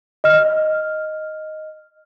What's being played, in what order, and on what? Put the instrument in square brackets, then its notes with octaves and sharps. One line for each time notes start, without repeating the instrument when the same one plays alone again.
[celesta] D#5 F6